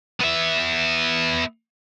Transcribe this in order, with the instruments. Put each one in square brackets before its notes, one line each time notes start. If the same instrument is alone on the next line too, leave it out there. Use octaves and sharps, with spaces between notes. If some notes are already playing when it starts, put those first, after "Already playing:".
[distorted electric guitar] B3 E5